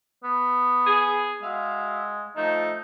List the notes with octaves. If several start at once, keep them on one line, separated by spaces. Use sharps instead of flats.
B3
G#4
G#3 F#4 E5 F5
F3 A3 D#4